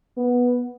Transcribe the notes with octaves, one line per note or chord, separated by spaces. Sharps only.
B3